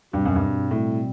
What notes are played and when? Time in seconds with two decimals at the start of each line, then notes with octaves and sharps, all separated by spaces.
0.13 G2 B2 G3 C4
0.25 F#2
0.36 G2
0.71 A2